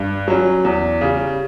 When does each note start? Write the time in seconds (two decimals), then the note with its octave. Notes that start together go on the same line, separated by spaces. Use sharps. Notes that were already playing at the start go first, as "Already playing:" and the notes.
Already playing: G2
0.28 F#3 C#4
0.64 E2
1.01 C#3 G3